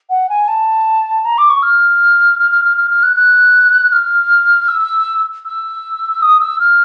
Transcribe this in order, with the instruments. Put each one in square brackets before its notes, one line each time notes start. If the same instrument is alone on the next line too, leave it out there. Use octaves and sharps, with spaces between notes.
[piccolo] F#5
G#5
A5
A#5
D6
C#6
F6
F6
F6
F6
F6
F6
F#6
F#6
F6
E6
E6
D#6
E6
F6